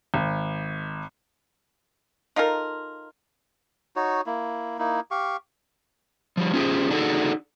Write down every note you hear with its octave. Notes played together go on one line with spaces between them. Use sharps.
G#1
D#4 F4 A4 A#4
D#4 F#4 C#5
A#3 E4
A#3 D#4 E4
G4 F5 C#6
F3 G3
C#4 F4 G4 G#4 C5
D4 D#4 F#4 G#4 A4